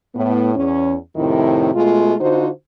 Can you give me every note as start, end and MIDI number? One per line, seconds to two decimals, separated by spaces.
0.15 0.52 45
0.15 0.52 59
0.56 0.95 40
0.56 0.95 61
1.16 1.72 41
1.16 1.72 45
1.16 1.72 48
1.16 1.72 51
1.16 1.72 63
1.16 1.72 64
1.74 2.15 47
1.74 2.15 56
1.74 2.15 57
1.74 2.15 65
2.20 2.48 50
2.20 2.48 63
2.20 2.48 65
2.20 2.48 66
2.20 2.48 72